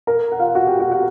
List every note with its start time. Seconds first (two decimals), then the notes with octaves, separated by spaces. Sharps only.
0.07 A#4 A#5
0.32 F#5
0.39 F4 F5
0.55 F#4 F#5
0.67 G4 G5
0.80 F#4 F#5
0.91 F#4 F#5